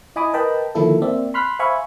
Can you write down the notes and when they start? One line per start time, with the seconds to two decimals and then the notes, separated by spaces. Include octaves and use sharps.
0.16 E4 D#5 G#5 B5 D6 D#6
0.33 A#4 B4 D#5 G5 A5 B5
0.75 D3 D#3 F3 A#3 E4 A4
1.02 A#3 C4 D5 E5
1.34 B5 C6 F6 F#6 B6
1.59 C5 E5 F5 G#5 B5 C#6